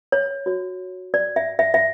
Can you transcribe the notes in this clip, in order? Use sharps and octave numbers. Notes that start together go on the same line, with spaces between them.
C#5
F#4 C#5
D5
E5
E5
E5